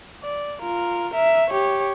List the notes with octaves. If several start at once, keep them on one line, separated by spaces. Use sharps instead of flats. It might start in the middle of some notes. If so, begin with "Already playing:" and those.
D5
F4 A#4
A#4 E5
G4 C#5